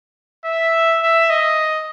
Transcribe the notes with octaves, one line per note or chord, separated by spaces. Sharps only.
E5
E5
D#5